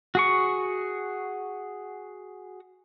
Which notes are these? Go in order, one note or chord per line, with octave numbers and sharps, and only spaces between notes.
F#4 G#4 C#6